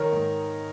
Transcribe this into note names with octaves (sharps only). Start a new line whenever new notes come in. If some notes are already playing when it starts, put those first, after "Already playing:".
Already playing: D#3 A#4 C#5
G#2